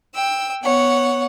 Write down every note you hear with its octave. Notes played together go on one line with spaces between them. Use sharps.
G5 E6
B3 C#5 F#5